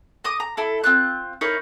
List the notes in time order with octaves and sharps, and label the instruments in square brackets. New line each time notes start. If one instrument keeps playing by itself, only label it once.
[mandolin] D#5 D6 D#6
A#5
E4 A4
C4 F4 F#6
D#4 E4 A#4 C#5